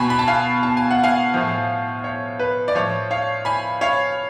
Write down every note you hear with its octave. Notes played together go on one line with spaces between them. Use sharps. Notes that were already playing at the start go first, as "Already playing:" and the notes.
Already playing: B2 G#5 B5
B5
A5
F5 G#5
A5
G#5
F#5
F5 G#5
A2 F3
C#5
B4
D5
A2 F3 C#5
C#5 F5
G#5 B5
C#5 F5